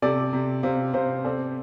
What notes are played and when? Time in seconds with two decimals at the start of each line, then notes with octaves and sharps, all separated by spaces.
0.02 C3 A4 D5
0.33 C3
0.63 C3 C5 F5
0.93 C3 C5 F5
1.24 C4 A4 D5